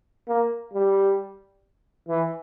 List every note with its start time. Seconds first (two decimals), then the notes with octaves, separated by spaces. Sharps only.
0.28 A#3
0.74 G3
2.09 E3